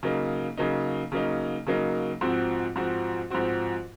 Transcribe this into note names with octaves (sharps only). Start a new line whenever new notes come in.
C#3 F#3 A#3 D#4
C#3 F#3 A#3 D#4
C#3 F#3 A#3 D#4
C#3 F#3 A#3 D#4
G#2 F3 C4 F#4
G#2 F3 C4 F#4
G#2 F3 C4 F#4